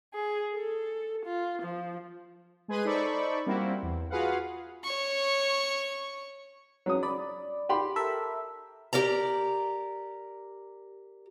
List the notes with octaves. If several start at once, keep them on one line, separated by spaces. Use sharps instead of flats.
G#4
A4
F4
F3
G#3 G#4 B4 C6 D#7
D#4 A4 C5 D5 B5 C#6
G3 A#3 C4 E4 F#4
E2
F4 F#4 G#4 B4 F5 F#5
C#5 C#6
F#3 C#4 D#6
D5 B5
G4 B5 C6
A4 A#4 E5
G4 A#4 D5 A#5